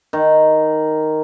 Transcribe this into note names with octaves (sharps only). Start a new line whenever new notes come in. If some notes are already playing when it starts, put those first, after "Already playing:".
D#3